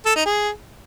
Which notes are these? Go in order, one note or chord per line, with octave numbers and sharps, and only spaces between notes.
A4
D#4
G#4